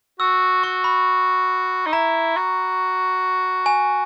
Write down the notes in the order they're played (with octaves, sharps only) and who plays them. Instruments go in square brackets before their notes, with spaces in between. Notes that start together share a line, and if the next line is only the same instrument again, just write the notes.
[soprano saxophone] F#4 [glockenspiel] E6
[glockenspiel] C#6
B5
[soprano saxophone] D#4
[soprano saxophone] E4 [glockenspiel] A#5
[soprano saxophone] F#4
[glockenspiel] G#5